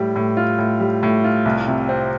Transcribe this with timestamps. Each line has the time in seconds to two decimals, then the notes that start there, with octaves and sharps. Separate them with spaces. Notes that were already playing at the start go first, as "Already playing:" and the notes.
Already playing: A2 G3
0.16 A2
0.37 F4
0.58 A2
0.80 G3
1.03 A2
1.24 F4
1.45 C2
1.68 C3
1.89 C4